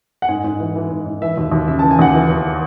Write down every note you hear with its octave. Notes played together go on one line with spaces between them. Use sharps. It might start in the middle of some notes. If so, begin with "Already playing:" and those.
F#5
G#2 G#5
G#2
E3
E3
G#2
G#2
E3 E5
D#2
D#2
C#3 E5
E3 A5
G#5
D#2 F#5
E3
E2